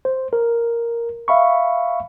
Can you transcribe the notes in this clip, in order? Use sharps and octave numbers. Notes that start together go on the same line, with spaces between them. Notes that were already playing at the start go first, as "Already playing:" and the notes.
C5
A#4
E5 F5 B5 C#6